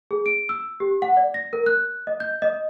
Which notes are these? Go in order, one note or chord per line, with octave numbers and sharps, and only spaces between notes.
G#4
D7
E6
G4
F#5
D5
A#6
A#4
F#6
D#5
G6
D#5